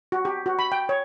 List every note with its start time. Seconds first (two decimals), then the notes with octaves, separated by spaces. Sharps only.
0.12 F#4
0.25 G4
0.46 F#4
0.59 B5
0.72 G5
0.89 C#5